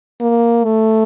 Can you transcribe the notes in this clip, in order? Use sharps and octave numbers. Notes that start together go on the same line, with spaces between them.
A#3
A3